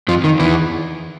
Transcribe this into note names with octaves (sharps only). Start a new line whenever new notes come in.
F2 F3
D#3
E2 E3